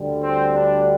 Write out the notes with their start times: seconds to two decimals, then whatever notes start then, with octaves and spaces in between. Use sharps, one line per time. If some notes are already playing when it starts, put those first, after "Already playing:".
Already playing: D2 D3 G3
0.22 C4
0.55 D4